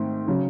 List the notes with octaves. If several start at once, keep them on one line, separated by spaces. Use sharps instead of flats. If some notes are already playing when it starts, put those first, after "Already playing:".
Already playing: G#2 D#3 A3 C4
C#3 F#3